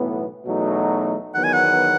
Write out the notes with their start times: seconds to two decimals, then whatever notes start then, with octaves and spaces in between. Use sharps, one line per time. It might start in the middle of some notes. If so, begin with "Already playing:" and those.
Already playing: B1 A2 E3 B3
0.45 E2 B2 F#3 A3 D#4
1.34 E2 D#3 F#3 B3 F#5
1.44 G#5
1.53 F#5